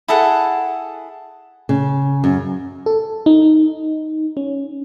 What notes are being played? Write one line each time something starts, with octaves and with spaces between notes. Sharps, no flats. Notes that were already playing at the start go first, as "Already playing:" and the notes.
E4 G#4 A4 F#5
C#3
F#2
A4
D#4
C#4